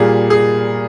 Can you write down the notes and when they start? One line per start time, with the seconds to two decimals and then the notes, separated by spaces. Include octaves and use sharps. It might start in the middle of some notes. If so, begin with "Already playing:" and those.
Already playing: A#2 G3 A#3 G#4
0.30 G#4